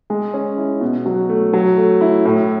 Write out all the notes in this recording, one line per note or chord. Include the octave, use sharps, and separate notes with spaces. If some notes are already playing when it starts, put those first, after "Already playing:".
G#3
C#4
E4
B2
F#3
A3
F#3
A3
E4
A2